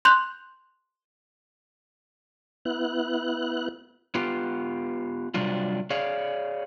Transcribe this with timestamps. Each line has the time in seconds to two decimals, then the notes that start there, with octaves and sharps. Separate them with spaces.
0.05 C6 F#6 G6 F7 F#7
2.65 B3 E4 F#6
4.15 B3 F4 G4
5.34 C3 F#3 G3 D4 F4
5.90 G#4 C#5 D5 F5